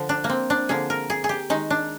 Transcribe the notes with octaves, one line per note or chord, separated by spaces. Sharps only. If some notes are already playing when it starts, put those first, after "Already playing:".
Already playing: D3 F3
D4
A#3
C4
D4
D3 F3 A#3 G#4
A#4
G#4
G#4
G4
D#3 G#3 D#4
D4